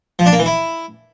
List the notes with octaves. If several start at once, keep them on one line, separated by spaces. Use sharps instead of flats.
F3
D4
A#3
E3
E4